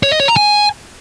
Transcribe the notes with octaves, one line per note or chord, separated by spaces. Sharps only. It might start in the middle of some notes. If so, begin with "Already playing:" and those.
C#5
D#5
C#5
A#5
G#5